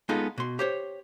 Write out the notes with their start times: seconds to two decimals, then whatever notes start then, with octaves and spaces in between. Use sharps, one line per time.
0.09 G#3 B3 D#4 F4 G#4 A4
0.38 B2 C6
0.59 G4 C5 C#5